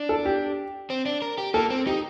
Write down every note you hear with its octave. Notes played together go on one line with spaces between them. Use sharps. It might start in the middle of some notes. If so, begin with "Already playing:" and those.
Already playing: D4
A4
G4
C4
D4
A#4
G4
A#3 A4
C4
D#4 G4